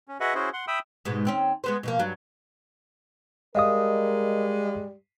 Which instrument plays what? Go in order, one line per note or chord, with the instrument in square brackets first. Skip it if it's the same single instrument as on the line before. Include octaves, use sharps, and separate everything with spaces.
[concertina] C#4
F#4 G#4 B4 D#5 E5 F#5
C#4 E4 F#4 G#4 C5
F#5 C6
E5 G5 B5 D#6 E6
[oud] G#2 B2 G#3
D#2 C4 C#4
G#3 B3 C5
B2 F3 A#3
G2 F#3
[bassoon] G3 [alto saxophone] G#3 [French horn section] A#4 [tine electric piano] D#5 F5 D#6